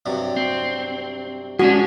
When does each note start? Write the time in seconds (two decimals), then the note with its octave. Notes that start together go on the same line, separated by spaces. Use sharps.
0.06 G2 C3 F#3
0.37 C4
1.59 G#3 C#4 D4 F#4